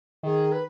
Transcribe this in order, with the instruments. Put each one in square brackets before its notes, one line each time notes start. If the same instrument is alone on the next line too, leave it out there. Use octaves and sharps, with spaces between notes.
[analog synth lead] D#3 [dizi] G#4
[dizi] B4